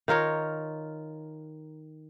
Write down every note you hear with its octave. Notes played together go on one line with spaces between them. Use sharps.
D#3 F4 A#4 C#5